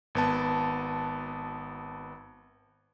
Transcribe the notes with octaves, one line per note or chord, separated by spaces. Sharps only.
G#1 B3 A5